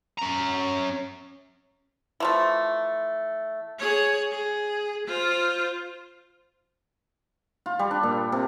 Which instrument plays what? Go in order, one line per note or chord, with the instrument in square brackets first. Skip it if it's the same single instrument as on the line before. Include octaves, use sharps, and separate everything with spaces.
[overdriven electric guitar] C#4 A#5
[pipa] E3 F3 A3
[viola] G#4 C#5
G#4
F4 C5
[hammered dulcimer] F4
G3
D4
A#2
C3